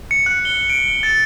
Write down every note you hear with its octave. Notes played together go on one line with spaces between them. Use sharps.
C#7
F#6
G7
D7
A6